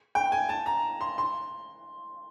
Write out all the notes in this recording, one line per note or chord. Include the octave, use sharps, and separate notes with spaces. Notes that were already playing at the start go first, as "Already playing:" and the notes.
G5
G#5
A5
A#5
C6
C6